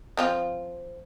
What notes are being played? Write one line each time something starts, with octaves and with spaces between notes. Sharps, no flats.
F3 C4 F4